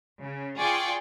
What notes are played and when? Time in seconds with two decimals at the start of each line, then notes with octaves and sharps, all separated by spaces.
0.21 C#3
0.60 F4 G#4 D5 G5 G#5 C#6